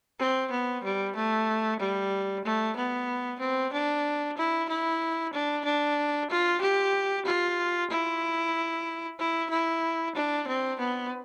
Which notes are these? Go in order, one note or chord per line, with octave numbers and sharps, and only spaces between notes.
C4
B3
G3
A3
G3
A3
B3
C4
D4
E4
E4
D4
D4
F4
G4
F4
E4
E4
E4
D4
C4
B3